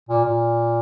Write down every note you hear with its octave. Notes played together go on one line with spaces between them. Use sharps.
A#2
A#2